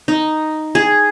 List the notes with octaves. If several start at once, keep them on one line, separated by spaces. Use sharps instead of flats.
D#4
G#4